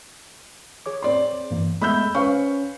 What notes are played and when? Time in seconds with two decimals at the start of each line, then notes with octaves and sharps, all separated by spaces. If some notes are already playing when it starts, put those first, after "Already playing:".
0.86 G#4 C#5 D6
1.02 C4 D5 C6
1.51 G2 E3 A#3
1.82 G#3 A3 B3 B5 E6 G6
2.15 C#4 B4 C5 F5 C#6